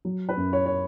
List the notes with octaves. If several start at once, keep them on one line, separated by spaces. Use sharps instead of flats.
F#3
B4
F#2
C#5
C#5